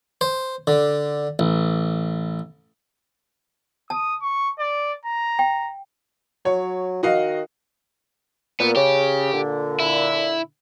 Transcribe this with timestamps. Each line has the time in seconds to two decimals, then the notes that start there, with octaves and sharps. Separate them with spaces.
0.21 C5
0.67 D3
1.39 A1
3.90 A5 D#6
4.22 C#6
4.59 D5
5.05 A#5
5.39 G5
6.45 F#3 C#5
7.03 D#3 F#4 D#5 F5
8.60 A#2 B3
8.76 C#3 G4
9.33 A#2 D3
9.80 E4